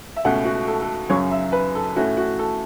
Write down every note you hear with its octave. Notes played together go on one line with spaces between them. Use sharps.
E5
C#2 B2 A3 C#4 F#5
F#4
A4
A4
F#2 C#3 F#3 C#5
E5
B4
A4
A2 A3 C#4 F#4
F#4
A4